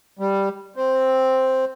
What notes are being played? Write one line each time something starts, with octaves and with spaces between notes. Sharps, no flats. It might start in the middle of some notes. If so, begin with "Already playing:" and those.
G3
C4